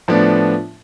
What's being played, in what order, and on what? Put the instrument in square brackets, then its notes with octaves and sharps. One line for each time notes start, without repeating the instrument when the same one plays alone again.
[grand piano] A2 F3 B3 D4